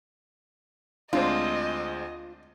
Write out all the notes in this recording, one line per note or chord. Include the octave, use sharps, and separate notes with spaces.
D2 G#3 C4 D4 F4 C5 D#5